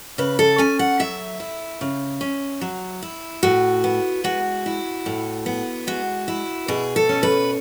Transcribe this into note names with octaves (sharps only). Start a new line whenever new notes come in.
C#3 B4
A4
C#4 G#5
F#5
F#3 E5
E4
C#3
C#4
F#3
E4
A2 F#4
B3
G#3 F#4
E4
A2
B3
G#3 F#4
E4
B2 G#4
A4
C#4
B4